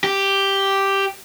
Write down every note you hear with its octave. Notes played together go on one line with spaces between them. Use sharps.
G4